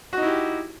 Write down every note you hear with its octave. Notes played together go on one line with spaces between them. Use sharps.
D#4 E4 F#4 G4